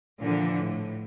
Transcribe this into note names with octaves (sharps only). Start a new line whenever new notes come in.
A#2 D3 E3 F3
A2